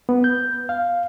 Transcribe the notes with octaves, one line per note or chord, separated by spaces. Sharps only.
B3
G6
F5